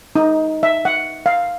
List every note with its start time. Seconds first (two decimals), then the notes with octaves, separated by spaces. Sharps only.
0.16 D#4
0.63 E5
0.85 F#5
1.26 F5